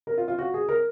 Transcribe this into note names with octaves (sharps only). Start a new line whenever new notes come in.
A#4
F4
F4
F#4
G#4
A#4